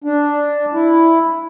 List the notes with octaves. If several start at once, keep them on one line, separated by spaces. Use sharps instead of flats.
D4
E4